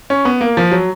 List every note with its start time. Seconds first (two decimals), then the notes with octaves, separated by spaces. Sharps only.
0.10 C#4
0.25 B3
0.41 A#3
0.57 F3
0.72 F#3